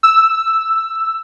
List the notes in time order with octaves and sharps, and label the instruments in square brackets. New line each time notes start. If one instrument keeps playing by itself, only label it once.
[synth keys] E6